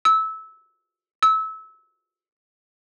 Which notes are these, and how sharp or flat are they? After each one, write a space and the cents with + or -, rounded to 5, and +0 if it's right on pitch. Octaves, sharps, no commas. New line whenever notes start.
E6 -20
E6 -25